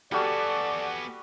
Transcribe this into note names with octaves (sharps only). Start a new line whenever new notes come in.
G3 B3 F#4 G#4 A4 D5